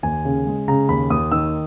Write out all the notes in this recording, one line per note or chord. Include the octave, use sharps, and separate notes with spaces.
D#2 G#5
C#3
G#3
C#3 A#5
D#2 B5
D#2 D#6
D#3 E6